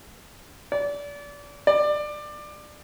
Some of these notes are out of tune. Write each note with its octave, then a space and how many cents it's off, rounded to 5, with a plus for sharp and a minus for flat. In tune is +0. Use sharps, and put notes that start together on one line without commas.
D5 -30
D5 +20